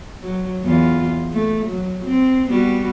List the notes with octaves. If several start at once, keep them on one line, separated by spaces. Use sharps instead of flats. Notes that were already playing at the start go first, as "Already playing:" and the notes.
F#3
E2 F4
A3
F#3
C4
G3 B3 F#4